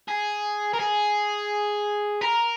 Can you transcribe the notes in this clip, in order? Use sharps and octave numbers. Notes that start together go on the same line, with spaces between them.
G#4
A#4
G#4
A#4